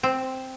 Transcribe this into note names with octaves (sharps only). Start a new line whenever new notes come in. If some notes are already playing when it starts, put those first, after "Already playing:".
C4